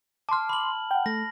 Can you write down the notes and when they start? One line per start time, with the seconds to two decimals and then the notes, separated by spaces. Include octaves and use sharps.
0.29 A5 C6 D6 F6
0.49 B5 F#7
0.91 F#5 G5
1.06 A3 A#6